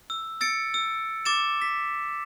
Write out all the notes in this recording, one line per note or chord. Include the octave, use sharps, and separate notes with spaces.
E6
E6 A6 C#7 D7
E6
D6 A6 E7
B6